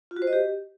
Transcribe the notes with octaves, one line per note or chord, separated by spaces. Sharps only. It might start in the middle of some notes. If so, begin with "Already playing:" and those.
F4
F#4
C5
D#5
G4